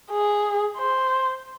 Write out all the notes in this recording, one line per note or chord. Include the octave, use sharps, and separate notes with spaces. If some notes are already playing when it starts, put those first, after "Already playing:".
G#4
C5